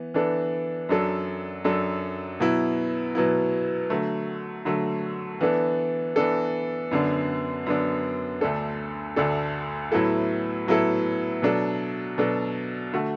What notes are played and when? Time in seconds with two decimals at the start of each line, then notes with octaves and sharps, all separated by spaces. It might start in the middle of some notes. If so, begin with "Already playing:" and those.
Already playing: E3 B3
0.14 E3 B3 D4 A4
0.89 F#2 F#3 D4 A4
1.64 F#2 F#3 D4 A4
2.40 B2 F#3 B3 E4
3.15 B2 F#3 B3 E4
3.90 D3 F#3 A3
4.65 D3 F#3 A3
5.41 E3 B3 D4 A4
6.16 E3 B3 D4 A4
6.91 F#2 D3 B3 D4
7.66 F#2 D3 B3 D4
8.41 D2 D3 A3 D4 A4
9.16 D2 D3 A3 D4 A4
9.92 A2 F#3 B3 E4 A4
10.67 A2 F#3 B3 E4 A4
11.42 B2 F#3 D4 A4
12.18 B2 F#3 D4 A4
12.93 D3 A3 F#4